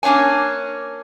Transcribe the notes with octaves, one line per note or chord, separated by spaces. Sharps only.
A#3 C#4 D4 C#5 G#5